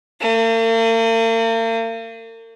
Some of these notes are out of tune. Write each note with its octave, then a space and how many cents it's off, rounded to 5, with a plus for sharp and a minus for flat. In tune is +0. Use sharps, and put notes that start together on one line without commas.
A#3 -45